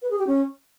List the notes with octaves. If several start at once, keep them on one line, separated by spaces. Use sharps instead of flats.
B4
G#4
G4
C#4